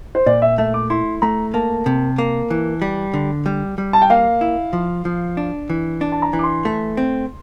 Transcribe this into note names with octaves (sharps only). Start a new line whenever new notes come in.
C5
A#2 D5
E5
A3 E5
D6
E4 C6
A3 A#5
A#3 A5
C3
A#3
E3
G3
D3
G3
G3
A5
G5
A#3 F5
E4
F3
F3
D4
E3
D4
A5
A#5
E3
D6
C6
A3
C4